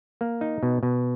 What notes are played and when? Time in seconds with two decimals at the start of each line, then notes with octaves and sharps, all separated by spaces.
0.21 A#3
0.41 D#4
0.63 B2
0.83 B2